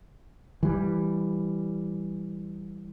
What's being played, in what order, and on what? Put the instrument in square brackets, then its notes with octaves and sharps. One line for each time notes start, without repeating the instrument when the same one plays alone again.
[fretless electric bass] E3 G3